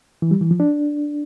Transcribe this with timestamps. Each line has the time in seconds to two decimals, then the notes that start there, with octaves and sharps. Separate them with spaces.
0.22 E3
0.31 G3
0.41 E3
0.51 F3
0.60 D4